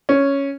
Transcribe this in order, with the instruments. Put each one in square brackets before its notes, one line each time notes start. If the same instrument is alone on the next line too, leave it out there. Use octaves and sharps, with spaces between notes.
[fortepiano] C#4